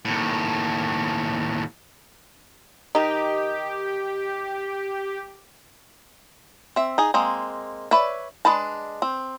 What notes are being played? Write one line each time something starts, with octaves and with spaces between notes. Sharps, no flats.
D#2 A2
D#3 D#4 G4
C4 E5
D#4 G#4
G#3 A#3 C4
B4 C#5 D5 E5
G#3 D4 B4 A5
C4